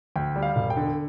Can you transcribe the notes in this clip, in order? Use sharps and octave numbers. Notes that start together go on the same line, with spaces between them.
D2 G5
G3
F5
E1
G5
D3